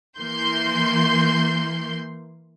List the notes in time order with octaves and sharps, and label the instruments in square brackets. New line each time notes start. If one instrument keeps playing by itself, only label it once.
[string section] E3 A#3 C6 G6